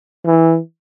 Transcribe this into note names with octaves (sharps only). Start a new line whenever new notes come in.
E3